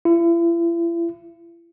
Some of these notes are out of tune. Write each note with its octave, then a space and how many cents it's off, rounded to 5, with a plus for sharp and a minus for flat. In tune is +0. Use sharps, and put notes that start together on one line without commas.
E4 +40